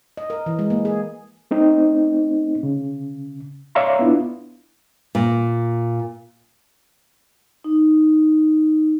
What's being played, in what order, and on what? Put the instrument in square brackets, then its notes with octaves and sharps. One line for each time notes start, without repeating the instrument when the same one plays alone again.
[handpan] D#5
A#4
E3
G#3
A#3
G#4
[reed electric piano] A3 C4 D#4
C#3
C#5 D5 E5 F5 A#5 C6
B3 D4 E4 F4
[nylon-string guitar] A#2
[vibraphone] D#4